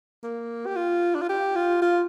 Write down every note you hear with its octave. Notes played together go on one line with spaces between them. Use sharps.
A#3
G4
F4
D4
F4
G4
F4
F4